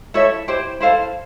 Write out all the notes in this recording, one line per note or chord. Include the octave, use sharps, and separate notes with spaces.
E4 A4 C#5 E5
E4 G4 C5
E4 A4 C5 F5